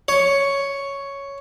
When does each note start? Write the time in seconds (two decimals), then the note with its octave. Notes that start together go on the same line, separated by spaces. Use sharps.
0.08 C#5